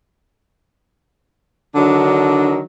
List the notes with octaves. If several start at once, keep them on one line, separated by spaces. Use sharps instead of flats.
D3 D#3 F#3 D4